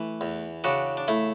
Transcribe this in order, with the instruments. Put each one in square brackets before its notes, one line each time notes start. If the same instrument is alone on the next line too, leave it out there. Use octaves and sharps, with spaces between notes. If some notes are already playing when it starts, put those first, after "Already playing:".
Already playing: [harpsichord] E3 A3
E2
C#3 D4 F#4
D4
A3 E4